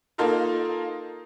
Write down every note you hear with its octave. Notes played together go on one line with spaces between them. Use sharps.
A#3 D#4 F4 A4 A#4